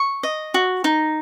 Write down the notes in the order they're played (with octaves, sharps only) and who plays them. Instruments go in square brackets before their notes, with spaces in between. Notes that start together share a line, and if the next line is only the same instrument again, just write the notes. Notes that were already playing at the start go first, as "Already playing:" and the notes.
Already playing: [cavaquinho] C#6
D#5
F#4
D#4